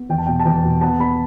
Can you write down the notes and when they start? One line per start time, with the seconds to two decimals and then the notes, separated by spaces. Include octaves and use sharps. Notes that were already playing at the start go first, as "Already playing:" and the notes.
Already playing: B3
0.09 E2 G5
0.18 A5
0.26 B2 G5
0.40 A5
0.45 E2 G5
0.64 B2
0.81 B3 A5
0.99 B3 B5